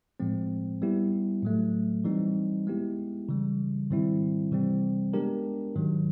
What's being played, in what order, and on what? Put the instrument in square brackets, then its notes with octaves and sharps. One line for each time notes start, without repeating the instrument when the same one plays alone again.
[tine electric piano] A2 F3 G#3 C4
G3 B3 E4 G4
A2 F#3 A3
E3 G3 C4 D#4
G#3 B3 E4 G4
C#3 E3 G3
G#2 D#3 G3 C4 E4
C3 E3 G3 C4
G#3 B3 D4 G4 A#4
G#2 D#3 F#3